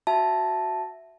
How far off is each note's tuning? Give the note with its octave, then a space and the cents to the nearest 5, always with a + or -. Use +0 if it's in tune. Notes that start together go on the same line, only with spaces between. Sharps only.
F#4 +0 E5 +5 A5 -5